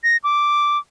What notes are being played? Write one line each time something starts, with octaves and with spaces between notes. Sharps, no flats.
A#6
D6